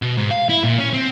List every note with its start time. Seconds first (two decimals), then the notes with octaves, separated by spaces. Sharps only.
0.02 B2
0.17 G#2
0.31 F5
0.49 E4
0.64 A#2
0.79 C#4
0.93 C4